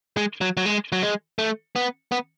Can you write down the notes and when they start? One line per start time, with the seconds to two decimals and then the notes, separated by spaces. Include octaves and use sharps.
0.17 G#3
0.41 F#3
0.57 F#3
0.66 G#3
0.92 F#3
1.02 G#3
1.39 A3
1.76 B3
2.12 B3